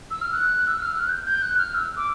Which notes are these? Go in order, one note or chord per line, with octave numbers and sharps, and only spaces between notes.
E6
F6
F#6
E6
F6
F#6
G6
G6
F#6
F6
E6
D6